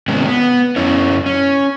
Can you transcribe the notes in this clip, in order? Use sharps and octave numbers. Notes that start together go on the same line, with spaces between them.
C3 D#3 G#3 B3 C#4
B3
F#2 C#4 E4 C#5
C#4